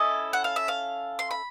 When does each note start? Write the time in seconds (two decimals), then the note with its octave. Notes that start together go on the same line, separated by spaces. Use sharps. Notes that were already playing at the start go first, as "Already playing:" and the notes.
Already playing: C#4 E4 A4 D#5
0.33 F#5
0.44 F5
0.56 E5
0.68 F5
1.19 C6
1.31 B5